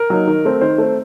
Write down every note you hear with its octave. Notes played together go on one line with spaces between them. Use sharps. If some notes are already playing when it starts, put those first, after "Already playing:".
Already playing: A#4
F#3 A#3 D#4
D#3
A3 C4
D#3 C5
A3 C4